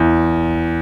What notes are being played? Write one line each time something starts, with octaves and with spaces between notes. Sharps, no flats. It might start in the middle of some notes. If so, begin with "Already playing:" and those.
Already playing: E2